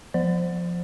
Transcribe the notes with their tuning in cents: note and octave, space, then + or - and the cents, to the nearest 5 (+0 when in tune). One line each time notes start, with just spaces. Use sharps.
F3 +5 C5 +0